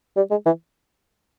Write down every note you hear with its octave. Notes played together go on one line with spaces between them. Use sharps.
G3
G#3
E3